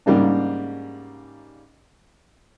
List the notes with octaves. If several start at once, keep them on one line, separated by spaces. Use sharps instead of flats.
G#2 C#3 G3 A#3 D4